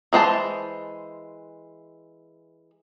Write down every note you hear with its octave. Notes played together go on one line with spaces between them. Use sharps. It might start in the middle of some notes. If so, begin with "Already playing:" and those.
E3 G#3 C5 A5